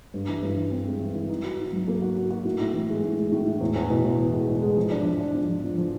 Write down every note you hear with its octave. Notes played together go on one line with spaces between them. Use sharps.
G2
E3
G2
E3
C4
G#3
E3
E3
D#4
F#4
D#4
F#3
A#3
F#4
F#4
F#4
A2
A2
E3
G#3
A2
G#3
A2
A2
E2
E2
B2
E2
E2
G#3
E2
G#3
F3
D4
F3
D4
F3
F3
F3
F3